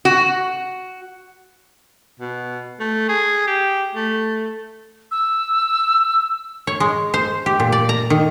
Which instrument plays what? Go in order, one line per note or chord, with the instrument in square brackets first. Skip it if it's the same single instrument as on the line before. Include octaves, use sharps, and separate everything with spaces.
[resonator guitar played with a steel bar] F#4
[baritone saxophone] B2
A3
G#4
G4
A3
[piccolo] E6
[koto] C#5
G#3
C5
G4
A#2
D5
A#5
D#3